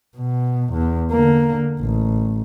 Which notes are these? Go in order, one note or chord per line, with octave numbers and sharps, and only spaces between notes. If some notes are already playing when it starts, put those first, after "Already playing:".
B2
E2
D3 A#3
A1